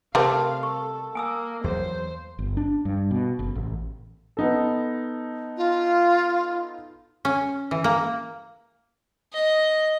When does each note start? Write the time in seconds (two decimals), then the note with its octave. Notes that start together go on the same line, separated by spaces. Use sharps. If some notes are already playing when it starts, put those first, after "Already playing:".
0.15 C3 G3 A3 C4 A#4 F5 A5
0.63 A4 C#6
1.15 A#3 G#5 D#6 E6
1.64 E2 F#3 C5
2.39 G1
2.57 D4
2.85 G2
3.11 B2
3.39 F#1
3.55 A1
4.37 B3 D#4 A4
5.57 F4
7.25 C#4
7.71 E3
7.84 A#3
9.33 D#5